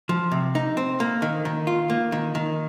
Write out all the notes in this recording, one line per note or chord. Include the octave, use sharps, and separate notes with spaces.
F3
C3
D#4
C4
A#3
D#3
D#3
F4
A#3
D#3
D#3